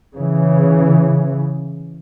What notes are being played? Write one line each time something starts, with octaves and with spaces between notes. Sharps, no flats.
C#3 E3